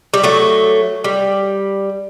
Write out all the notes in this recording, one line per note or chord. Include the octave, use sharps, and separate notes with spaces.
G3
F#3 A3
G3